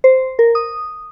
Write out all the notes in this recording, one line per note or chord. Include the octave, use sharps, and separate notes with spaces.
C5
A#4
D#6